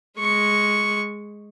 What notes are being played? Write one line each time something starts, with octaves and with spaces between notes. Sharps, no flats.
G#3 C#6